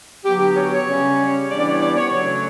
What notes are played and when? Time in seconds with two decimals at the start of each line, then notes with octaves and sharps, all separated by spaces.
0.25 D3 F#3 B3 G4
0.40 G4
0.56 C#5
0.72 C#5
0.87 C#3 G3 C#4
1.50 E3 G3 B3 D4 D5
1.60 D5
1.71 C#5
1.81 D5
1.96 C#5
2.12 C#3 F#3 A3 C#5